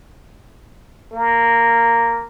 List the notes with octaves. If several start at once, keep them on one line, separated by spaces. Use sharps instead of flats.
A#3